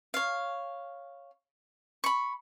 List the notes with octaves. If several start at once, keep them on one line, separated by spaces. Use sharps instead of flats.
C#5 F5
B5 C#6